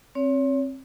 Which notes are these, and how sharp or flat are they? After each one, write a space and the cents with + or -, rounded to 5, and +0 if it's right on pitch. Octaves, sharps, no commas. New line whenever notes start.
C4 +30 C#5 +30